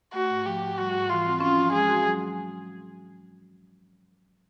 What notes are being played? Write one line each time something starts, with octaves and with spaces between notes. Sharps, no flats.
A3 F#4
G#2
F3 G4
G#2
G3 F#4
G#2
E3 F4
C4
C#4 F4
F3
G#3 G#4
F#4
F#3